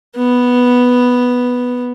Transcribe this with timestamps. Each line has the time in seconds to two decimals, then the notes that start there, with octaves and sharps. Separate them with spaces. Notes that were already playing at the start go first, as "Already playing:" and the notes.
0.16 B3